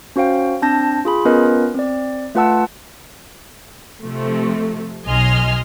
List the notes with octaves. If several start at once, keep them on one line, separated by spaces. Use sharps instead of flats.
C#4 F#4 C5 F5 G5
C4 D4 A5 G6 A#6
F4 G#4 B5
B3 C#4 F4 A#4 B4 D#5
C4 D5
A3 F4 B4 F#5 A5 E6
C3 F3 A3
B1 F#3 D#5 G#5 C6 F6